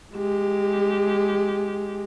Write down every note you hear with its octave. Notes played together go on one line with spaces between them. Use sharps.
G#3 G4